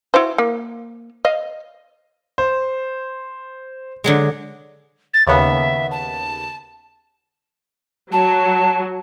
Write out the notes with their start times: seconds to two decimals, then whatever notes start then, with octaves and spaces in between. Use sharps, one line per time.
0.14 E4 F#4 C5
0.38 A#3
1.25 D#5 F5
2.38 C5
4.04 D3 F#3 G#3
5.14 A6
5.27 D#2 C#3 B3 E5
5.91 A5
8.12 F#3 A5